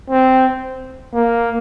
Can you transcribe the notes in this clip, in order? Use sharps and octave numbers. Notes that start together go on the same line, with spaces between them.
C4
A#3